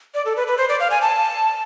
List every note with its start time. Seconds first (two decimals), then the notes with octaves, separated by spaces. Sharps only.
0.14 D5
0.25 A4
0.36 B4
0.47 B4
0.58 C5
0.69 D5
0.80 F5
0.91 G#5
1.02 A5